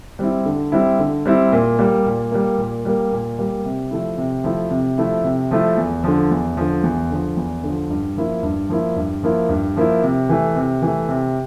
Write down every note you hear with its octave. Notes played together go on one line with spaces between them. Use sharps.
G3 C4 E4
D3
G3 C4 E4
D3
G3 C4 E4
A#2
G3 A#3
A#2
G3 A#3
A#2
G3 A#3
A#2
G3 A#3
C3
F3 A3 E4
C3
F3 A3 E4
C3
F3 A3 E4
C3
F3 A3 E4
E2
D3 F3
E2
D3 F3
E2
D3 F3
E2
D3 F3
G2
F3 A#3 E4
G2
F3 A#3 E4
G2
F3 A#3 E4
G2
F3 A#3 E4
C3
E3 A3
C3
E3
A3
C3